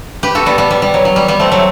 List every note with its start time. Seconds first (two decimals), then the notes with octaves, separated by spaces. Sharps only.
0.23 G4 B4
0.35 F#4 A4
0.46 G3 B3
0.58 G3 B3
0.71 G3
0.82 G3
0.94 F#3
1.05 F#3
1.16 G3
1.28 G3 B3
1.39 A3 C4
1.52 F#3 A3